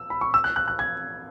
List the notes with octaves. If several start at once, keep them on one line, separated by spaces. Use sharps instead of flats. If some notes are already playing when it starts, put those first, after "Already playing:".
Already playing: E6
B5
C#6
E6
F#6
F#6
F#6
G#6